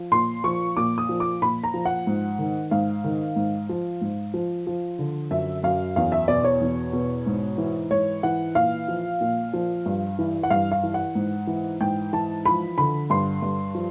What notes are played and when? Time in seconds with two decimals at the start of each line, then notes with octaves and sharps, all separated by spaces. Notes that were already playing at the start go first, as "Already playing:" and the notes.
Already playing: F3
0.11 A#2 C6
0.44 F3 C#6
0.77 A#2 D6
0.98 D#6
1.09 F3
1.20 D6
1.42 A#2 B5
1.64 A#5
1.74 F3
1.85 F#5
2.07 G#2
2.39 D#3
2.71 G#2 F5
3.04 D#3
3.36 G#2
3.69 F3
4.01 G#2
4.34 F3
4.67 F3
4.99 D3
5.31 F#2 E5
5.63 F#2 F5
5.96 E2 F5
6.12 E5
6.28 B2 D5
6.44 C#5
6.61 E2
6.93 B2
7.26 G#2
7.58 E3
7.91 G#2 C#5
8.23 E3 F#5
8.55 A#2 F5
8.88 F3
9.21 A#2
9.54 F3
9.86 G2
10.19 E3
10.43 F#5
10.50 G2 F5
10.72 F5
10.83 E3
10.94 F#5
11.15 G#2
11.47 E3
11.80 G#2 G5
12.13 E3 A5
12.46 F3 B5
12.78 D3 B5
13.10 G2 C6
13.42 G2
13.75 F3